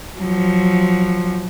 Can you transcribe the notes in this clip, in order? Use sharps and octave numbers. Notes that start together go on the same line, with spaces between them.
F3 F#3